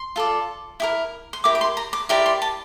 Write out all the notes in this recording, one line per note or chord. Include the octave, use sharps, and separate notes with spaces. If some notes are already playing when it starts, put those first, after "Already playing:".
Already playing: C6
F4 A4 D5
E4 G4 A#4
C6
E4 G4 A#4 D6
D6
C6
A#5
D6
E4 G4 A#4 D5 C6
C6
A5